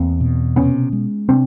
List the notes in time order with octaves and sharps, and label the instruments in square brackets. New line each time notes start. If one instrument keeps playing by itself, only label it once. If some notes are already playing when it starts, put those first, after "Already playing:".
Already playing: [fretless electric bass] E2 [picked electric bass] A#3 C4
[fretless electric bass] B2
[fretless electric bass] C3 [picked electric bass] B3 C#4
[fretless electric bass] G#3
[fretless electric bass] C3 [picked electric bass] C4 D4